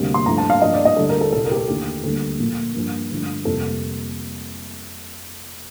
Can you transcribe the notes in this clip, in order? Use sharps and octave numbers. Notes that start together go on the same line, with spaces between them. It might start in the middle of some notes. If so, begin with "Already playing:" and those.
Already playing: D2 C3 G3 A#3
C6
G2 F3 A3 A#5
A5
F5
G2 F3 A#3 D#5
D5
D#5
D2 D3 G3 A4
A#4
A4
C2 A#2 G3 A#3 A4
A#4
G4
A4
D#2 D3 A3 G4
D2 D3 G3 A#3 A4
A#2 F3 A#3
G2 F3 A#3
G2 D3 F3 A3
F2 C3 G3 A#3 A4